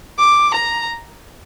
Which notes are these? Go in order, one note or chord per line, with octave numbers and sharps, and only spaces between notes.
D6
A#5